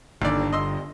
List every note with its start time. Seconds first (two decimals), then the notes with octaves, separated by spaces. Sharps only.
0.22 G1 D#2 D3 D5
0.53 D#5 C6 E6